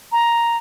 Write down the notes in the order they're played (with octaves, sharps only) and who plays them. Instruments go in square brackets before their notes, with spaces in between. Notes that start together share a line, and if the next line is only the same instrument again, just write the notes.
[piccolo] A#5